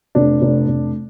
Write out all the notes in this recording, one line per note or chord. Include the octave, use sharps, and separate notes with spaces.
F1 D4
F1
F1